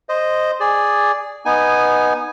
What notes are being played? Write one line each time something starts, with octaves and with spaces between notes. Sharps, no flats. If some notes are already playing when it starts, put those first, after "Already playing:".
C5 D#5
G#4 D5
B3 D#4 G#5